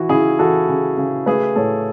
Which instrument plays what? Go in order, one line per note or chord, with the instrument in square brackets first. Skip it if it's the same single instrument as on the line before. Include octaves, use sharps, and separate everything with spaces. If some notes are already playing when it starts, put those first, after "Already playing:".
Already playing: [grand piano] E3 F#4
C#3 E4 G#4
E3 F#4 A4
C#3
C#3
A3 G#4 B4
A2 A4 C#5